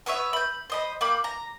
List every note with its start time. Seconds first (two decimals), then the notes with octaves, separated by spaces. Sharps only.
0.06 B3 B4 C#5 E5
0.33 B5 G6
0.70 C5 D#5 B5
1.01 A#3 G4 B5 D6
1.24 A#5